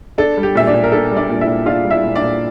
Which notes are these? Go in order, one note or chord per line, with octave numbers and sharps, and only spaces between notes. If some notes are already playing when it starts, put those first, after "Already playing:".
D4 A4
G3
G4
A#2 E5
D4 D5
A#2
A#4
D4 A4
G3
D4 D5
A#2
E4 E5
A#2
D4 F4 F5
G3
E4 E5
A#2
D4 D5
A#2